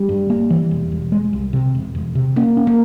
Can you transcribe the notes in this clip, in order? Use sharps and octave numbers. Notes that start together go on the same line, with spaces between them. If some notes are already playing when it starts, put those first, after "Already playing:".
Already playing: G3
G2
A#3
E3
E1
E1
G#3
C2
C3
E1
E1
C3
A#3 C#4
C#4
A#3